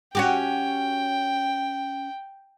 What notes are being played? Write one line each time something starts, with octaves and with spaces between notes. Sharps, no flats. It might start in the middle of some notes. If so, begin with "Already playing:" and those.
C#4 F#4 G4 G5